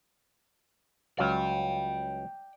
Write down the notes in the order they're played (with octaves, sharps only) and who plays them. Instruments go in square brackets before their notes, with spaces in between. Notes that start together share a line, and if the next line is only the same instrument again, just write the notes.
[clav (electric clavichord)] C#2 F#3 F5 [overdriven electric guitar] D5 G5